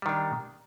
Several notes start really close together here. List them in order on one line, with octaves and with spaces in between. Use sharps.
G3 D#3 D4